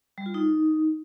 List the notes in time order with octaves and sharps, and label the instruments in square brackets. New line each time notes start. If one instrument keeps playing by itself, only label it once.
[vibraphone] G3
F4
D#4